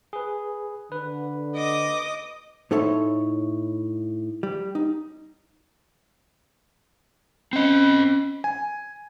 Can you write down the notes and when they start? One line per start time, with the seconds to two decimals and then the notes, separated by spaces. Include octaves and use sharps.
0.13 G#4 B4
0.92 D3 B4
1.54 D#5 D6 D#6
2.71 A2 D#4 A4 C#5 E5 C6
4.43 G3
4.75 D#4
7.53 C4 C#4 D#5
8.44 G#5